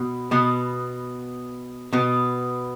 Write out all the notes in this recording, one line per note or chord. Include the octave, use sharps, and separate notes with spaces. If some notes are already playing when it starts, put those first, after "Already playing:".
Already playing: B2 B3
B2 B3
B2 B3